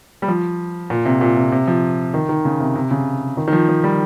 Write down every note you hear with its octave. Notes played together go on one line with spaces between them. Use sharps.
G3
F3
A#2
C3
A#2
C3
C3
F3
D#3
D#3
C#3
C3
C3
C#3
D#3
D#3
F3
F3
G3